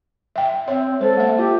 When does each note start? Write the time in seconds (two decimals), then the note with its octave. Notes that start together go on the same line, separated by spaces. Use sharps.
0.36 E5 G5
0.68 C4 C#5 E5
1.00 G#3 A4 C5
1.17 A#3 E5
1.38 F4 G4